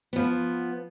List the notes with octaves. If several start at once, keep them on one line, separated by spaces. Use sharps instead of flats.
F3 B3